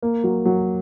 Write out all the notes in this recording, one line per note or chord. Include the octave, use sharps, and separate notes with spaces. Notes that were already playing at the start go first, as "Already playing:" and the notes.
A#3
F#3
F#3